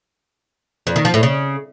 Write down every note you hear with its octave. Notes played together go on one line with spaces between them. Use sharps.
F2
D#3
F3
A2
C#3